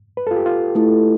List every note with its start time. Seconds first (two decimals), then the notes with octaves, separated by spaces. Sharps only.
0.17 B4
0.27 F4 A4
0.36 G4
0.46 F4
0.75 A3 E4 A4